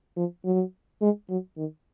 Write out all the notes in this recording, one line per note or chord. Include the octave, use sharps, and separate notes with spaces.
F3
F#3
G#3
F#3
D#3